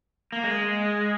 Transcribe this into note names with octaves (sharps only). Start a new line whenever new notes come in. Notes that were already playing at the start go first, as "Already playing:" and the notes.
A#3
G#3